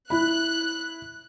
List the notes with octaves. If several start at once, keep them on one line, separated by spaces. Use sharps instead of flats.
E4 B5 F#6